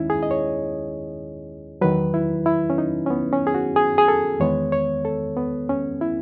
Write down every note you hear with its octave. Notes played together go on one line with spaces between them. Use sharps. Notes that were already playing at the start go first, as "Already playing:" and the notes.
Already playing: D#2 D#3 G#3 C#4 D#4 E4
G#4
D#5
C#5
E2 D#3 F#3 B4
E4
E4
C#4
D#4
C#4
B3
C#4
G#4
F#4
G#4
G#4
A4
E2 D#3 G#3 B3 C#5
C#5
A4
B3
C#4
E4